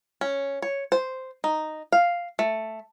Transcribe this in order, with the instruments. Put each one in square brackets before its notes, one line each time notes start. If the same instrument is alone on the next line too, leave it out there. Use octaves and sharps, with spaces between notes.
[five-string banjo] C#4
C#5
C5
D#4
F5
A3